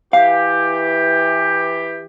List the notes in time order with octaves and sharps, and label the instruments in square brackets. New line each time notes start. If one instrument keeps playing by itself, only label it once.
[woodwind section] E3 G4 [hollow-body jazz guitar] F5